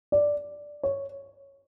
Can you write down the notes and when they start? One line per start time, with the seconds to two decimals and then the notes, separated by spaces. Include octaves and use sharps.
0.12 D5
0.83 C#5